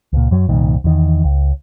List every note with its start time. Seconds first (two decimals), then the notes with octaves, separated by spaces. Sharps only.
0.13 C#2 A#2
0.31 F#2 F#3
0.49 C2 G2 A#2 D#3
0.84 E2 D#3
1.24 C#2